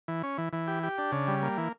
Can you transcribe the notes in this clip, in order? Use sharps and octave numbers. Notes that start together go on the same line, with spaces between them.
E3
C#4
E3
E3
G4
G4
D4
C#3
G3
A#3
E3